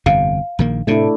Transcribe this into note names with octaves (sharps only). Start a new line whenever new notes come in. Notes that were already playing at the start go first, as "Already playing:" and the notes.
G1 F2 C3 F5
A#1 D#3 A#3
A2 C3 A3 D4 E4